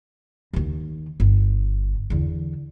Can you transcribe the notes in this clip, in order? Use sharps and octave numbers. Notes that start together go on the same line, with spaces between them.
D#2 D#3
G1
E2 D3